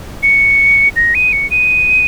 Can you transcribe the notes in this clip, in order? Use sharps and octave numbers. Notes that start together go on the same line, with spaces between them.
C#7
A#6
D#7
C#7
D#7